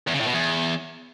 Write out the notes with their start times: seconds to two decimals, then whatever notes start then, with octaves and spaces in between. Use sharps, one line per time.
0.07 E2
0.13 C#3
0.20 A2
0.27 B2
0.33 E2